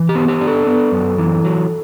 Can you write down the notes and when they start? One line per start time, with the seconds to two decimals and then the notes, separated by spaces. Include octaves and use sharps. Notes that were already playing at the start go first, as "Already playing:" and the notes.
Already playing: E3
0.09 G4
0.15 B3
0.28 G4
0.41 D4
0.47 A4
0.67 B3
0.92 F#2
1.18 E3
1.44 F#3